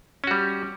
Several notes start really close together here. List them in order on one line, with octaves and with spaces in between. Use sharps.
C#4 F#4 G3